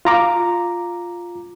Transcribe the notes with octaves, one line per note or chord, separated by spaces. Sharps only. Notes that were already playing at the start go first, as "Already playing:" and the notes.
F4 A#5 D6